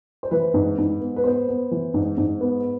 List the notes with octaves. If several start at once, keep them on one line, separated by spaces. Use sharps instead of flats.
C5
E3 B4
G#2
G#2
B3
B4
B3 C5
B3
E3
G#2
G#2
B3